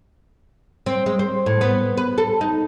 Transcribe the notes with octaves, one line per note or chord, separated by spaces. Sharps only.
C4
G#3
C5
A2
B3
B4
A4
D#4